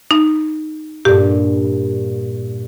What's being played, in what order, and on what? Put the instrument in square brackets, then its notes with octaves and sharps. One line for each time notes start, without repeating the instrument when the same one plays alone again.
[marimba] D#4
[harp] G2 A#2 [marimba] G4